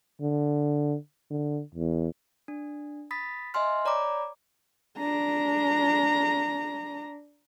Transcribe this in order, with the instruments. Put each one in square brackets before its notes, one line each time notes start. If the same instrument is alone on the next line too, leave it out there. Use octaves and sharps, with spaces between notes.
[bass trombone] D3
D3
E2
[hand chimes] D4
B5 D#6 A6 B6
D#5 E5 G#5 C6 F6
C#5 D5 A#5 B5 D6
[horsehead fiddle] D4 A#5